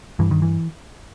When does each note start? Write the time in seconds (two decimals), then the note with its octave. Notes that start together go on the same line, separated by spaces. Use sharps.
0.19 G2 E3
0.31 D#3
0.42 E3